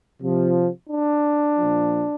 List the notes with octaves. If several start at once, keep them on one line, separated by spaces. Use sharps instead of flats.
C3 F3
D4
A#2 F3